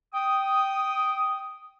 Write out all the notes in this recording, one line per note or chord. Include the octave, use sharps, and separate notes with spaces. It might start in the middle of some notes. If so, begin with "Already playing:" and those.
G5 D#6